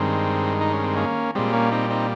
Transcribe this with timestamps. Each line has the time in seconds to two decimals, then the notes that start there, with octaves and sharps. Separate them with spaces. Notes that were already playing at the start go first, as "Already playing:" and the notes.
Already playing: G2 D#3 G#3 C4
0.61 D#4
0.73 C#4
0.84 C4
0.96 A#3 C#4
1.35 A#2 G3 G#3 C4
1.53 A#3 C#4
1.72 C4 D#4
1.90 C4 D#4